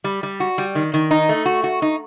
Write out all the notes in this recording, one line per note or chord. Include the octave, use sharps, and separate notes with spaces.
G3
G3
F#4
G3
D#3
D#3
D#4
A3
F#4
F#4
D#4